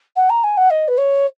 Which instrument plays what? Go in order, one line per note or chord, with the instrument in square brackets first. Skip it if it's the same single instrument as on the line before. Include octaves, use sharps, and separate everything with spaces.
[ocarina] F#5
A#5
G#5
F#5
D#5
B4
C#5